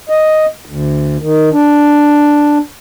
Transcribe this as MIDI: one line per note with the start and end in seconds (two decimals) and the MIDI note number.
0.09 0.45 75
0.65 1.17 38
1.21 1.49 51
1.53 2.58 62